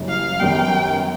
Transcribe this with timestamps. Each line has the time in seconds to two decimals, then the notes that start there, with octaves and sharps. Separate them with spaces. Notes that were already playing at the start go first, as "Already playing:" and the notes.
Already playing: F#1 F#2 C#3 E3 G3
0.08 F5
0.40 F#2 D#3 G3 B3 G5